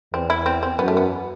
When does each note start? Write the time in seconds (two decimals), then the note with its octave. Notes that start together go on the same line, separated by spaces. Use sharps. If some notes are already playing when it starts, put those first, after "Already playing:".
0.14 E2 C4
0.30 E4
0.46 C4
0.63 C4
0.79 F#2 B3
0.88 A3
0.97 B3